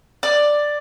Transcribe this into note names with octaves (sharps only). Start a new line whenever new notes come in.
D5